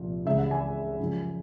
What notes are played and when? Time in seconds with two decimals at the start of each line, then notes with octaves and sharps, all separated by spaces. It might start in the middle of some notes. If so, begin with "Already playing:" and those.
Already playing: C2 A#2 F3
0.26 C#2 C#3 E3 E5
0.38 F#5
0.51 G#5
0.99 F#2 C#3 F3